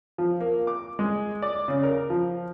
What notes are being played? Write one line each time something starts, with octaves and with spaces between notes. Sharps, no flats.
F3
A#3
D6
G#3
D5
C#3
A#4
F3